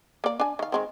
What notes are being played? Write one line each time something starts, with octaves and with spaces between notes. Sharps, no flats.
A#3 D5
D4 G#5
D#3 F5
D#3 G#3 C4